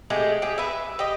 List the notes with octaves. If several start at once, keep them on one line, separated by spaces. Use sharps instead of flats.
G#3 A3 G4 G#4
G4 G#4
B4 E5
G4 D#5